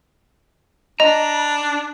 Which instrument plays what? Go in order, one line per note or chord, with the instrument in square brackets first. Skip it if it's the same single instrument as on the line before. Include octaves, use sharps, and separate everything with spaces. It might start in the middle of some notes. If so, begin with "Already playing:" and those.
[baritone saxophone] D4 [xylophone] D#5 [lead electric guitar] A#5